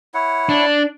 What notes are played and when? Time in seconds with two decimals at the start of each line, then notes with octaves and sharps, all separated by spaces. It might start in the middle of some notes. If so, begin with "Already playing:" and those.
0.14 E4 C#5 F#5
0.49 D4